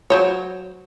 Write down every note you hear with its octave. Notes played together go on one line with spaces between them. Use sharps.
F#3 C5 C#5